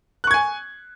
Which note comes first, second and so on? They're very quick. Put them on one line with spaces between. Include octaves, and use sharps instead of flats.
F#6 C#6 G#6 G#5